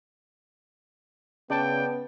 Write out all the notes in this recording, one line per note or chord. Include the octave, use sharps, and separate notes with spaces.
C#3 B3 D5 G5 A5